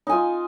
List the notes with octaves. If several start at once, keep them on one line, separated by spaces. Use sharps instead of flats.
D#4 F4 G#5